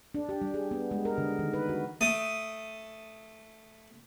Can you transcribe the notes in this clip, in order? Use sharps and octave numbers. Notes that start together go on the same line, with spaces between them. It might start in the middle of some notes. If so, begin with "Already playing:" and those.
D4
G4
G3
G#4
B3
G#3
A#4
D3
D#3
B4
F#4
A3 D#6